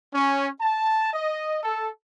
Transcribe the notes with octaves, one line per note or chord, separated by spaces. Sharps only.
C#4
A5
D#5
A4